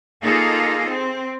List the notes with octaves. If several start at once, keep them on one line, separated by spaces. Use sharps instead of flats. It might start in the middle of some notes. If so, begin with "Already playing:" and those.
A#3 D#4 F4 G#4 A4
C4